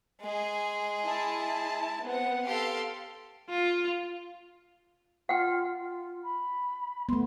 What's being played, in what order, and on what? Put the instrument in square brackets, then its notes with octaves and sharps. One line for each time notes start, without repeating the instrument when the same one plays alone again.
[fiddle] G#3 G#4
[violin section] E4 A5
B3 C4 F#5
[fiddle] G4 A4 [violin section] F5 C6
[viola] F4
[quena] F4 [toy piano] F#5 G5
[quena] F4
B5
[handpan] A3 B3 [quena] C6